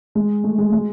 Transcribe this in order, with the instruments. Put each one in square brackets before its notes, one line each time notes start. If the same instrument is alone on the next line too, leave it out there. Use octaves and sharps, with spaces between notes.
[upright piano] G#3
A3
G#3
G#3